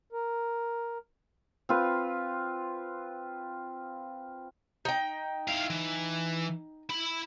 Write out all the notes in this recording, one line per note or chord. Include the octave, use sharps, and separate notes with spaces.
A#4
C4 F4 B4
D#4 G5
E4 F5
E3
E4 B5